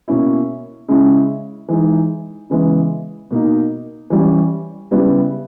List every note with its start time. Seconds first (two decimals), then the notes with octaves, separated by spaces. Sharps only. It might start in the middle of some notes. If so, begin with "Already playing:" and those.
0.08 B2 A#3 C#4 E4
0.88 C#3 G#3 C#4 E4
1.68 E3 G#3 D#4
2.50 C#3 E3 G#3 B3 E4
3.31 B2 A#3 D#4
4.10 E3 G3 C#4
4.91 C#3 G3 B3 E4